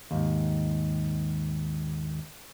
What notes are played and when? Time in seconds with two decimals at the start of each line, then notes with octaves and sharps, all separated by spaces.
0.11 D#2 G#2